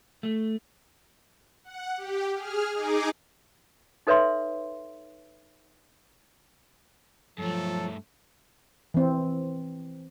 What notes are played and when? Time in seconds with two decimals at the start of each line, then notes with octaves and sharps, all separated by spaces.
0.23 A3
1.64 F#5
1.97 G4
2.35 G#4 F6
2.74 D#4 G#4 D6
4.07 D#4 A4 B4 C#5 E5 C6
7.38 G2 F3 F#3 A3 A4
8.94 E3 C4